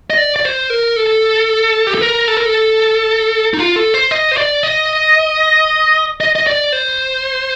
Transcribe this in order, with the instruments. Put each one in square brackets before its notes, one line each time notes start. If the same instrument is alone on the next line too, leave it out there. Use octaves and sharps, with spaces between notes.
[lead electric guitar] D#5
D5
D5
C5
A#4
A4
G4
A4
A#4
A4
A#4
A4
D#4
F4
A4
C5
D#5
C5
D5
D#5
D#5
D#5
D5
C5